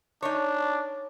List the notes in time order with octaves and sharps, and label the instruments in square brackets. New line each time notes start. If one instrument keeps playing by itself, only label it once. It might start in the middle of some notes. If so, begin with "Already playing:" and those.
[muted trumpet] D4 [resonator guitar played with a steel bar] D#4 C#5